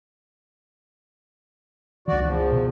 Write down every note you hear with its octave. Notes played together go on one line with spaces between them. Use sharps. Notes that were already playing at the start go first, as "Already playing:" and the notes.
C#2 E3 F#4 D5
E2 F3
B2